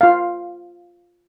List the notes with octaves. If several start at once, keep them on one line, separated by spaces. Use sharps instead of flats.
F4 F5